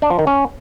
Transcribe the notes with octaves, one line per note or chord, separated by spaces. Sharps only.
D4
F3
D#3
C#4